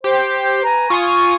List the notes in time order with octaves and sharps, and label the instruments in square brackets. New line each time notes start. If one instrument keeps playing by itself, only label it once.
[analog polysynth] G4 [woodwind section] C5
[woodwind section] B4 G#5 A#5
[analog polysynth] F4 G#5 D#6 [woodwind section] C#6